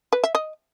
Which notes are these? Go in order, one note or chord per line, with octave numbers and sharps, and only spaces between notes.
B4
E5
D#5